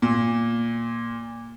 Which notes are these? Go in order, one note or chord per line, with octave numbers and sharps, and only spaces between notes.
A#2